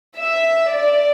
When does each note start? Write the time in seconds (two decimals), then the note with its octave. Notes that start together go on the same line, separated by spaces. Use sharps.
0.17 E5
0.71 D5